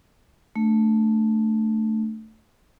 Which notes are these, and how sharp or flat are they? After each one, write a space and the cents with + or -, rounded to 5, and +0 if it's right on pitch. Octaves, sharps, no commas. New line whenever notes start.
A3 +0 D4 +0